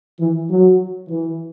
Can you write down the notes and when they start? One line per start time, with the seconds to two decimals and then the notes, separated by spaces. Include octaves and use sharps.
0.20 E3
0.49 F#3
1.08 E3